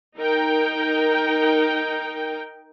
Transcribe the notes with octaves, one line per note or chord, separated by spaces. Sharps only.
D#4 A#4 G5